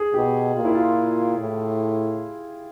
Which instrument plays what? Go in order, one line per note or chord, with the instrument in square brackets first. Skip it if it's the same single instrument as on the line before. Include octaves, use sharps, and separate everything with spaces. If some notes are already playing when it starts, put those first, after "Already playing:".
Already playing: [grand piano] G#4
[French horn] B2 [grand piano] G4
[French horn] A#2 [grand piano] F4
[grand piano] E4
F4
[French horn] A2